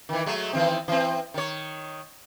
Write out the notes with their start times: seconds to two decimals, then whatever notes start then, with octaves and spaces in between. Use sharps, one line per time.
0.09 D#3 E3
0.26 F#3 G#3 A3
0.53 D#3 E3 C4
0.88 E3 C4
1.34 D#3 C#5